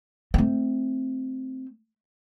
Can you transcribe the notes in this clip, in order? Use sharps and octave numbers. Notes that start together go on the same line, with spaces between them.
A3 C4